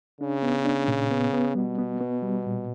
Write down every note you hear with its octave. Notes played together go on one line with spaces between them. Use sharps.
C#3 D4
B3
D4
A#2
B3
B3
B2 G3
B3
B3
G3
A#2